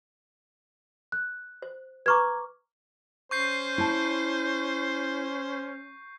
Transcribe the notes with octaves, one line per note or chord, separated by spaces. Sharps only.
F#6
C5
B4 A#5 C#6 D6 F6 G#6
C#4 C5 C#6 G6 C7
E4 A5